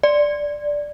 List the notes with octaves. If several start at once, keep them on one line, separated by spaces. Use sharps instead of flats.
D5